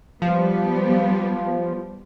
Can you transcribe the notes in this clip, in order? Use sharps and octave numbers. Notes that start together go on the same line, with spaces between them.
F3 G3 B3 G4